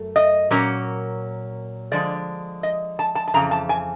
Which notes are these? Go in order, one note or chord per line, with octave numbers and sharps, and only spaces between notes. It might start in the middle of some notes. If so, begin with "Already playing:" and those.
Already playing: F#2 A3
D#5
A#2 F#3 A#3 C#4
D3 F3 G#3 D5
D#5
A5
A5
A5
F2 C#3 E3 A#5
A5
G#5